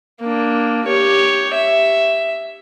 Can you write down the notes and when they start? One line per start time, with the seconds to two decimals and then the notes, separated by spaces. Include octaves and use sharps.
0.21 A#3 D4
0.85 G4 C#5
1.54 E5